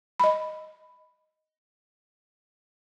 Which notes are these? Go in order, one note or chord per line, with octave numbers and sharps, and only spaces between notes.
D#5 B5